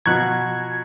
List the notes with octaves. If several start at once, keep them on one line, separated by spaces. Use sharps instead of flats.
B2 F3 A#5 C#6 F#6 G#6